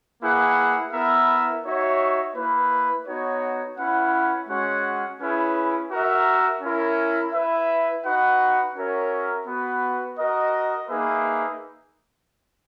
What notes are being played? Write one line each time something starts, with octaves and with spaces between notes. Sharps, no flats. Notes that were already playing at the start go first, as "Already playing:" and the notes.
A#3 E4 G#4 B4 F#5
B3 E4 A#4 E5
D#4 F#4 C#5 E5
A#3 E4 B4
B3 D#4 F#4 C#5
C#4 E4 B4 F#5
G#3 C#4 F#4 C#5 F#5
C#4 E4 G#4 B4
F#4 A#4 E5
C#4 E4 A#4
E4 B4 E5
D#4 F#4 B4 F#5
C#4 F#4 A#4 C#5 E5
B3 F#4 B4
F#4 A#4 D#5
A#3 D#4 G#4 B4 E5